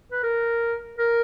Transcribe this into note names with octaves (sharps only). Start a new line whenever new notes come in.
B4
A#4
A#4